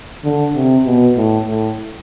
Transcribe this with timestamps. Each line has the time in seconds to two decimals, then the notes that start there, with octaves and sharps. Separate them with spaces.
0.24 D3
0.55 C3
0.86 B2
1.16 A2
1.48 A2